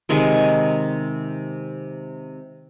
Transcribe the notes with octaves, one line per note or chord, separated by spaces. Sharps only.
C3 D#3 G#3 G#5